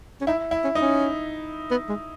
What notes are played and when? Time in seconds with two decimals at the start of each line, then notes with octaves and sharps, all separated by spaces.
0.21 C#4
0.27 D#4 E4
0.51 E4
0.64 C#4
0.75 D#4
0.81 C#4
1.71 B3
1.89 G#3